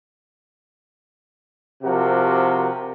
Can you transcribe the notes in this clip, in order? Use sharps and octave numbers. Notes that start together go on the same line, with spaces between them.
C3 F3 F#4 G4 A#4